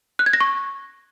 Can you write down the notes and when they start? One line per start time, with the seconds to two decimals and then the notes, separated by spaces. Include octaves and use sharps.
0.19 F#6
0.26 G#6
0.33 A#6
0.41 C#6